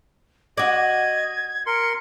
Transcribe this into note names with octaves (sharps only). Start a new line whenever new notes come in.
F#4 D5 D#5 G#6
A#4 C6 C#7